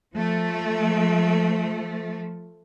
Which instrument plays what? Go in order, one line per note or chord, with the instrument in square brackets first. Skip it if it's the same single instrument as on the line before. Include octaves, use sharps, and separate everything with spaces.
[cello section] F3 A3